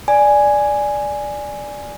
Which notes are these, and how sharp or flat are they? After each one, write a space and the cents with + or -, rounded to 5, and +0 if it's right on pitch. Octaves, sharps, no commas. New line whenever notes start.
D5 +0 G#5 +0